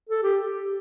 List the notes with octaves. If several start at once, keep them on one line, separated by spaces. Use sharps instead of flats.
A4
G4